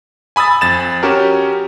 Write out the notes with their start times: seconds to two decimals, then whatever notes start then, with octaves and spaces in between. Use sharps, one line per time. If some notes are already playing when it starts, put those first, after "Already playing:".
0.36 G#5 B5 D#6 E6 A6
0.61 F2 A6 E7
1.03 C#4 F#4 G4 A#4